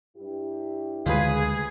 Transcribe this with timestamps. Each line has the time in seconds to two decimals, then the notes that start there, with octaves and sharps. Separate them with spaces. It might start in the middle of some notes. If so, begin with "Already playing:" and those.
0.17 G2 E4 G4
1.06 D2 C#3 G#3 F4 G#4 B4